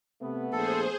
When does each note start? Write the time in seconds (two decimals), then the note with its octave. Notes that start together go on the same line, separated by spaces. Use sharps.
0.22 C3 A3 B3
0.52 A#1 G#4 A4 C5